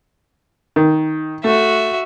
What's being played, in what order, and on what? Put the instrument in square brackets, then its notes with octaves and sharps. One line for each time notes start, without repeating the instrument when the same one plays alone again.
[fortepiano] D#3
[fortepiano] A3 [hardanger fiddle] F#4 E5